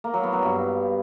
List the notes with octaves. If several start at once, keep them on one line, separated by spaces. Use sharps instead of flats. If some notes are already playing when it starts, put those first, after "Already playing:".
A#3
F#3
B3
F#3
G2